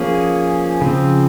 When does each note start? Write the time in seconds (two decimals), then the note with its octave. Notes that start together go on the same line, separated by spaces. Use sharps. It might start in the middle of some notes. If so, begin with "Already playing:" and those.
Already playing: F3 A#3 C#4 G#4
0.81 C#3 F3 C4